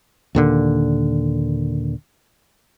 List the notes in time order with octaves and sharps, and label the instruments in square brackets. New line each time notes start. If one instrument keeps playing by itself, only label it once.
[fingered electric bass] D#2 A#2 D3